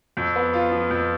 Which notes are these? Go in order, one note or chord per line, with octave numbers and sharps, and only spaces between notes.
F2
B3
F4
F3
F2